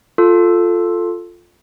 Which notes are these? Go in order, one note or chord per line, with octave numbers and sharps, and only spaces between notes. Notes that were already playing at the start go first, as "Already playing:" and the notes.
F4 A4